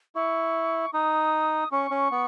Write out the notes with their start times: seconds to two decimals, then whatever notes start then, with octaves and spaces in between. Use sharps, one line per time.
0.15 E4 C#6
0.93 D#4 D#6
1.71 C#4 C#6
1.91 C#4
2.11 B3